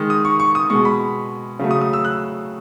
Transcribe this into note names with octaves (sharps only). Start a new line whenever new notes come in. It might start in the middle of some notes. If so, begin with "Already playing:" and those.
Already playing: D#3 G#3 D#6
D#6
C#6
C#6
D#6
B2 G#3 C#6
B5
C#3 F#3 A3
D#6
D#6
E6
F#6